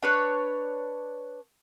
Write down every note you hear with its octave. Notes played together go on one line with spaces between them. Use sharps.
D4 B4 C#5